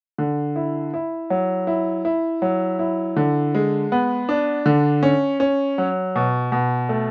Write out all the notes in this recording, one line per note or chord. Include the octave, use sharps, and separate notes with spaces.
D3
E4
E4
F#3
E4
E4
F#3
E4
D3
G#3
B3
D4
D3
C#4
C#4
F#3
B2
B2
A3